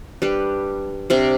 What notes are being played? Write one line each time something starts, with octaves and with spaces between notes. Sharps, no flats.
G3 D4 G4 B4
C3 G3 D4